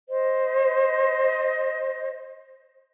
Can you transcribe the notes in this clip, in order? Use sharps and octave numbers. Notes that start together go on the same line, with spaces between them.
C5 D#5